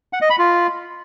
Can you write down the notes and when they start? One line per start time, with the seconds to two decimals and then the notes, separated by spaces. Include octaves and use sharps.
0.13 F#5
0.21 D#5
0.30 B5
0.38 F4